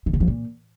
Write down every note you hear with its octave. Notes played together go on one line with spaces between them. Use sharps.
D#3
C#3
F3
A#2